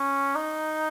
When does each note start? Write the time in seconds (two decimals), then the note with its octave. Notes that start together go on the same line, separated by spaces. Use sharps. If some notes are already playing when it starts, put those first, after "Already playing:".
Already playing: C#4
0.35 D#4